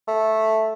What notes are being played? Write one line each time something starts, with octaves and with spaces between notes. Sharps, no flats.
A3